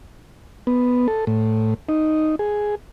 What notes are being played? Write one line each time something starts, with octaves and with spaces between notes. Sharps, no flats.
B3
A4
A2
D#4
G#4